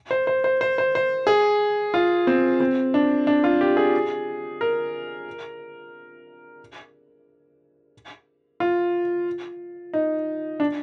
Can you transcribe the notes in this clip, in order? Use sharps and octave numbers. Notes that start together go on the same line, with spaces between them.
C5
C5
C5
C5
C5
C5
G#4
F4
C4
C4
D4
D4
F4
G4
G#4
A#4
F4
D#4
D4